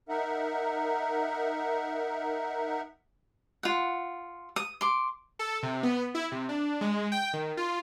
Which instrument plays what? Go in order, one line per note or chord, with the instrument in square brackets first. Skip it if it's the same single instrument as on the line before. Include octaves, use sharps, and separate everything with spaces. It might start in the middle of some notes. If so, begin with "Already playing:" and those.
[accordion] D#4 A#4 E5 F#5
[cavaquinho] F4 F#5
D#6
C6 D6
[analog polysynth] A4
C3
B3
E4
C3
D4
G#3
G5
D#3
F4